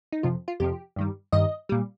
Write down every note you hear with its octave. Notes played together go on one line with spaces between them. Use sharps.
D#4
F2 C3 F3 F4
F4
F2 C3 F3 G4
G2 D#3 G3
G2 D#3 G3 D#5
A#2 G3